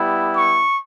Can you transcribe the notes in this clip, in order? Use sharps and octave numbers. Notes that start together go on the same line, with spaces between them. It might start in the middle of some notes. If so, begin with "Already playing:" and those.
Already playing: G3 B3 E4 G4
C#6